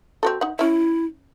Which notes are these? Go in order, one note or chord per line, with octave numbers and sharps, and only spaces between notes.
C4 F#4 A4
D#4 F#5
C#4 E4 E5